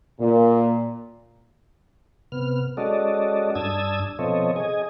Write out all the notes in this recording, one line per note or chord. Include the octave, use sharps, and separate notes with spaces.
A#2
C3 B3 F6
G#3 C#4 F#4 A4 D5 D#5
G2 D4 A5 D#6 E6 G#6
B2 F3 C4 A4 C#5 D#5
G#4 D#5 G#5